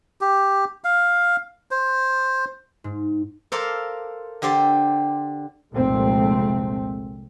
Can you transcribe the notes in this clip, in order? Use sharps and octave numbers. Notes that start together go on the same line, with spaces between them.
G4
F5
C5
G#2
A4 A#4 C5 D5 F5
D3 G4 C5 D5 A5
F1 C2 A#2 G#3 A3 C4